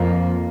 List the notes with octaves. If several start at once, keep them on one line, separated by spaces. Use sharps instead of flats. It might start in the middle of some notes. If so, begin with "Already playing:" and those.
Already playing: F2 F3 A#3